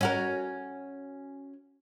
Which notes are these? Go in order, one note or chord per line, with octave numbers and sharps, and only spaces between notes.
C#4 F#4 A#4